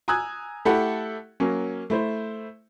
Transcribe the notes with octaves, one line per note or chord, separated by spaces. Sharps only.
G#5 A#5 D#6 E6 F#6 G#6
A3 E4 G4 A4 F#5
F#3 A#3 C#4
A3 E4 C5